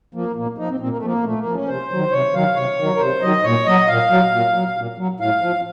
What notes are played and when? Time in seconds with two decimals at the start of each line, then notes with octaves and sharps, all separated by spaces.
0.15 F3 A#3
0.36 A#2 A#3
0.58 F3 D#4
0.70 C4
0.80 A#2 C4
0.89 A#3
0.97 A3
1.03 F3 A#3
1.24 A#2 A3
1.39 A#3
1.46 F3
1.54 C#4
1.68 C3 C5
1.91 D#3 F#3
2.12 C3 C#5
2.34 D#3 F#3 F5
2.56 C3 C#5
2.79 D#3 F#3
2.95 A#4
3.00 C3 C5
3.22 D#3 F#3 D#5
3.44 A#2 C#5
3.66 F#3 D#5
3.88 A#2 F5
4.10 F#3
4.32 A#2
4.54 F#3
4.77 A#2
4.98 F#3
5.20 A2 F5
5.42 F3